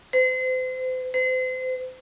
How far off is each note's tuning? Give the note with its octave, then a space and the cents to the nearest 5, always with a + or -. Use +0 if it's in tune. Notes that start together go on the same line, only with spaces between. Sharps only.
C5 -35
C5 -35